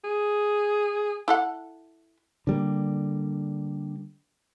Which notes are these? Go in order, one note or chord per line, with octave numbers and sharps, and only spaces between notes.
G#4
E4 A4 F#5
D3 G3 A#3